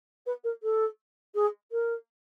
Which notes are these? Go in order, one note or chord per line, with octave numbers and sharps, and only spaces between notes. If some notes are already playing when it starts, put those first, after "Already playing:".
B4
A#4
A4
G#4
A#4